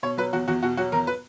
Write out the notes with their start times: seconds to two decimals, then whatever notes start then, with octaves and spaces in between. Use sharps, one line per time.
0.03 B2 C#5
0.17 F#3 B4
0.33 E2 F#4
0.48 E2 F#4
0.63 B2 F#4
0.77 F#3 F#4
0.92 E2 A#4
1.07 B4